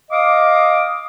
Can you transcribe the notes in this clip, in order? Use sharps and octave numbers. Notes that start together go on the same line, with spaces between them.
D#5 F5 D6 D#6